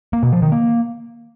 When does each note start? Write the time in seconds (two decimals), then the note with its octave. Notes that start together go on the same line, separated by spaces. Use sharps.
0.13 A#3
0.23 B2
0.33 F3
0.42 D#3
0.52 A#3